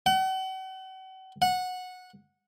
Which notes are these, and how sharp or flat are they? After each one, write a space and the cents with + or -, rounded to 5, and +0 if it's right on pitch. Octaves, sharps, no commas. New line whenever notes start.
F#5 +40
F#5 -15